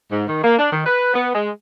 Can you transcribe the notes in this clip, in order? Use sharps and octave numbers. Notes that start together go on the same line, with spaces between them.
G#2
D#3
A#3
D4
D#3
B4
B3
G#3